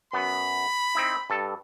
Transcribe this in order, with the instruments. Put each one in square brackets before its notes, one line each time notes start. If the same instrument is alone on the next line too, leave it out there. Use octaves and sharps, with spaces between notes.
[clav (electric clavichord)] F#2 B3 [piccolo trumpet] B5
[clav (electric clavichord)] C4 D#4 E4
G2 A4